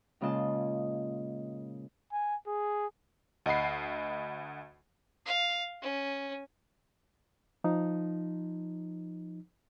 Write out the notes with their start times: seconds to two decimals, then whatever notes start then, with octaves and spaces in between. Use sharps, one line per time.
0.21 A#2 C#3 G#3 F4 D#5 A5
2.12 G#5
2.47 G#4
3.46 D2 D#5 F#5 B5 C7
5.26 F5
5.82 C#4
7.64 F3 D#4